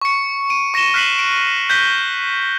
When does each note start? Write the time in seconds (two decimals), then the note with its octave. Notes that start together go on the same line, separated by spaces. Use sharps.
0.01 C#6 C#7
0.50 D7 D#7
0.74 C#6 A#6 C#7 E7 G7
0.94 F6 F#6 B6 C7 D#7 F#7
1.19 D7
1.69 F#6 G6 A#6 B6 G7